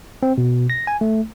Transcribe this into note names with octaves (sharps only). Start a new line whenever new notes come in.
C4
B2
A#6
G#5
A3